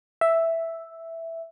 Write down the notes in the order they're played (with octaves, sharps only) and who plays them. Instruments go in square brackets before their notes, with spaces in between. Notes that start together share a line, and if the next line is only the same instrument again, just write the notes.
[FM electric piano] E5